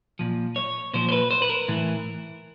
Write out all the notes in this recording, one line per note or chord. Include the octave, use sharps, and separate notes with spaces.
A#2 F3
C#5
A#2 F3 C5
C5
B4
C5
B4
A#4
A2 E3